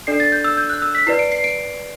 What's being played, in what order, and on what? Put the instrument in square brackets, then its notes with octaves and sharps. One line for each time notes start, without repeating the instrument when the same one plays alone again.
[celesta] D4 A4 D5 C7
A6
G6
E6
G6
F#6
E6
B6
E4 B4 D5 C7
D7
C7
D7